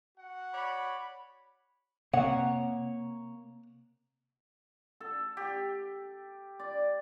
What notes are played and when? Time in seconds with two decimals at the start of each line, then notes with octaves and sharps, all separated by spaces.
0.17 F#4 F#5
0.53 C#5 D5 B5
2.13 C3 A#3 C#5 F#5
5.00 A4
5.37 G4
6.59 D5